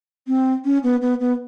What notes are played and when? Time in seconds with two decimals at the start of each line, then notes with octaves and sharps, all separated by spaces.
0.28 C4
0.65 C#4
0.83 B3
1.02 B3
1.20 B3